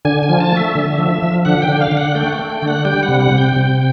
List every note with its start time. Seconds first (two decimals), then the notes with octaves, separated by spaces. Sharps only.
0.05 D3 G#5
0.23 G#5
0.29 F3
0.40 A5
0.52 A3 E5
0.75 D3
0.98 F3
1.22 F3
1.45 D3 F#5
1.62 G5
1.68 D3
1.81 F5
1.91 D3
1.97 F#5
2.15 A3 G5
2.27 F#5
2.33 G5
2.39 A3
2.50 G5
2.62 D3
2.67 F#5
2.85 G3 G5
3.03 F#5
3.08 C3
3.20 F#5
3.31 C3
3.38 G5
3.56 C3